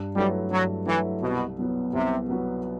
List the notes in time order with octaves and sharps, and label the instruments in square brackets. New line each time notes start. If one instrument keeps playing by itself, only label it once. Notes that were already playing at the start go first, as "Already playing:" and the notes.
Already playing: [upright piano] G2
[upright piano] F#3 A3 E4 B4 [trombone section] G3
[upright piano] G2 [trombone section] F#3
[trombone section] E3 [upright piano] F#3 A3 E4 B4
[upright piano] C2 [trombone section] B2
[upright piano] B2 F#3 B3 F#4
[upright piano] C2 [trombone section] C3
[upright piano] B2 F#3 B3 F#4